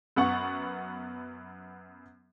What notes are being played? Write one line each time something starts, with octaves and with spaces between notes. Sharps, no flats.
F#2 B3 F#5 C#6